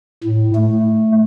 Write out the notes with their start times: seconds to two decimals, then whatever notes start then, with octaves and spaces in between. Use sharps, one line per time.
0.24 A2
0.55 A3